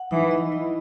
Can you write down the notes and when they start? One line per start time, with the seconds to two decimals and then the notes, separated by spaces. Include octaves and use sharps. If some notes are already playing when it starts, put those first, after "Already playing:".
Already playing: F#5
0.11 E3 D#4
0.31 D#5
0.52 E4